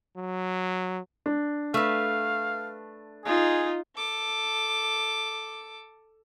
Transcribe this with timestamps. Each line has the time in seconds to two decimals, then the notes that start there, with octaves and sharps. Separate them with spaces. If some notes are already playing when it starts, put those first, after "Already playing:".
0.17 F#3
1.26 D4
1.74 A3 B4 F5
3.25 D#4 F4 G#4
3.96 A4 D6